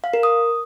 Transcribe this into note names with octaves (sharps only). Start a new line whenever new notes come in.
F5
A#4
D#6